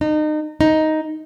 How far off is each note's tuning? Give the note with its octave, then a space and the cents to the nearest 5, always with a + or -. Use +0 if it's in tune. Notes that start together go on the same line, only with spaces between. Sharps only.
D#4 -30
D#4 +5